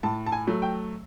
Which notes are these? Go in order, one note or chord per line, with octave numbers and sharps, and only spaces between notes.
A2 A5
A5
G#5
F#3 A3
G5